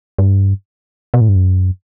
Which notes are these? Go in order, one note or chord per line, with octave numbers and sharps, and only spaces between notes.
G2
B2
A2
G2
F#2